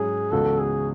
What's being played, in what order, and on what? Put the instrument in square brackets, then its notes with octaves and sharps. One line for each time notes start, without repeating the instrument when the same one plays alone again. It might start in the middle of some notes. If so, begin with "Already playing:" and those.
Already playing: [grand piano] G#2 F#3 C#4 E4 [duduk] G#4
[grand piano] C#2 C#3 E3 B3 F#4 [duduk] A4
[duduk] G#4